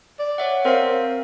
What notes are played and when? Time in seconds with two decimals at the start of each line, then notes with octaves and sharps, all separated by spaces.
0.19 D5
0.38 C#5 E5 F#5
0.65 C4 A#4 F5